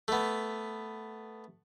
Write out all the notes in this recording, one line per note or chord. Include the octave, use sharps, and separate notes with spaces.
A3 B3